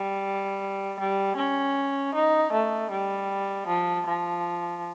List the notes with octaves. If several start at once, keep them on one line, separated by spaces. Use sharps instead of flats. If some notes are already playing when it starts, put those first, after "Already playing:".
Already playing: G3
G3
C#4
D#4
A3
G3
F3
F3